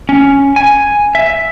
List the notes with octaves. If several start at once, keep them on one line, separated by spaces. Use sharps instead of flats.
C#4
G#5
E5